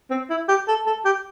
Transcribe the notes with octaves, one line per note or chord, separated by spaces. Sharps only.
C4
E4
G4
A4
A4
G4